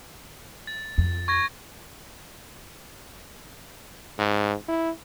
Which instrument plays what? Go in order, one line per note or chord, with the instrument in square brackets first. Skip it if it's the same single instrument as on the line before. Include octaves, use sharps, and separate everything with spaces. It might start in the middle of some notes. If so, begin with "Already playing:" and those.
[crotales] A6
[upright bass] F2
[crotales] C#6 G#6 A#6
[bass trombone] G#2
E4